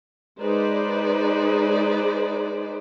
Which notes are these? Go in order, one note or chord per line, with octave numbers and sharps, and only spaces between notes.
G#3 D#4 G#4 B4 C5 D5